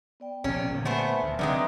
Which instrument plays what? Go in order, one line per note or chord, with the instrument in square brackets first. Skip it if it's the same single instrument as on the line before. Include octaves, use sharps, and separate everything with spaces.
[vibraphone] B3 D5 G5
[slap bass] A#1 C3 [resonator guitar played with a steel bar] C#4
[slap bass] A#2 D3 D#3
[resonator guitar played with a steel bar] A3 B3 C5 [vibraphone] E5 G#5 B5
[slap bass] D2
[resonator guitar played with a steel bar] D3 D#3 G#3 [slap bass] F#3 C4 [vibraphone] B4 E5 A#5